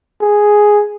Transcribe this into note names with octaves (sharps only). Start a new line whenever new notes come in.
G#4